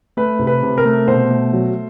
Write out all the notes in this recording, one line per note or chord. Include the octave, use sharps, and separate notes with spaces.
A3 B4
C3
B4
C3
A#4
A3
B2 C5
A3
F#3